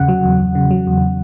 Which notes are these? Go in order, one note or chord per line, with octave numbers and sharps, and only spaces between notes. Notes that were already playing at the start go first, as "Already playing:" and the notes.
Already playing: E2 C#3 F#5
F#3
E2
E2
C#3
F#3
E2